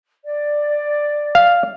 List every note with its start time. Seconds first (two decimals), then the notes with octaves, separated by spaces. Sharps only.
0.24 D5
1.35 F5